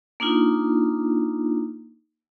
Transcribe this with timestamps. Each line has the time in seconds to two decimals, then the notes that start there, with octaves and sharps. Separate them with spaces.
0.20 A#3 D4 D#4 F4